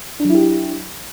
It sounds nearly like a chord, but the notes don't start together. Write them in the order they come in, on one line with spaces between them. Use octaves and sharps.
D4 F#3 E4 G4